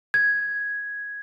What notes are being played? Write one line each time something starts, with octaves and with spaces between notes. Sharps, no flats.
G#6